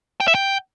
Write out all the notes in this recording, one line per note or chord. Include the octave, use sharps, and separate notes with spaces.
G5
E5
G5